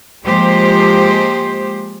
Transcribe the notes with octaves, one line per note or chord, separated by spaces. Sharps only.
F3 G#3 A#3 G4 C5